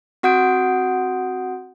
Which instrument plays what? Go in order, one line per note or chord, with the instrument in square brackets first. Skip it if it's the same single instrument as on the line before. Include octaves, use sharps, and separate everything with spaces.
[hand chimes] C4 F#4 F#5 D#6 G6 D7